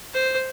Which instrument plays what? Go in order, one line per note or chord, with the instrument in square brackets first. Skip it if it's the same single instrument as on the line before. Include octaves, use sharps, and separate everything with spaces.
[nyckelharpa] C5